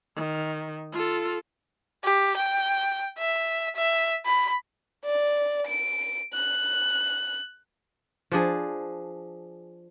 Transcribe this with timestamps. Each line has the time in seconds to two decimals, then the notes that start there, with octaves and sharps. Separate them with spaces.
0.16 D#3
0.92 F4 A4
2.04 G4
2.37 G5
3.19 E5
3.76 E5
4.26 B5
5.05 D5
5.67 D7
6.34 F#6
8.32 F3 D4 G#4